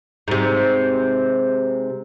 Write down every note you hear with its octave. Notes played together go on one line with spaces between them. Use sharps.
G#2 C3